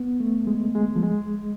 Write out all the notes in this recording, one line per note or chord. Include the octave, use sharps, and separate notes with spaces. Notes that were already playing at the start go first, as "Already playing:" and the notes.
Already playing: B3
A3
G#3
G#3
F3
G#3